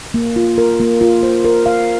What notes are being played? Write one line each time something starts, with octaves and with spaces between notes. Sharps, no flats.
A#3
F4
A#4
A#3
F4
C5
A#4
F5